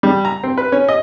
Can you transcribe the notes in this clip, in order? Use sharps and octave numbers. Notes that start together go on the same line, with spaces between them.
G3
A#5
C4
B4
C#4
D#5